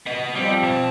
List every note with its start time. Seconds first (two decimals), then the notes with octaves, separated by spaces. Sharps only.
0.06 B3 D#5
0.35 F3 G3 C4
0.63 B2 A5